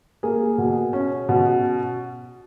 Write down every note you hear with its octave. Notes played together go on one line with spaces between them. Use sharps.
A#3 G#4
B2
C#4
B2